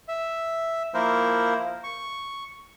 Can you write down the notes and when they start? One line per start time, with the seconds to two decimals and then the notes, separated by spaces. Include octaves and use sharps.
0.08 E5
0.94 F3 A#3 E4 A#4 C5
1.84 C#6